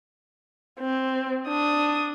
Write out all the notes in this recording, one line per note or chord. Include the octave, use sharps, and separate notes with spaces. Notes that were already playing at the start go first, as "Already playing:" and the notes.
C4
D4 D#6